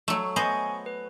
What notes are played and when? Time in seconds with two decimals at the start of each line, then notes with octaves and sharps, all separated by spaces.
0.08 F#3 A3
0.36 B3 C5 D#5 G#5 C#6
0.86 B4